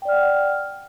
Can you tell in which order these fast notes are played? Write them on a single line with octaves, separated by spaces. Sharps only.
G5 D5 F6 F#5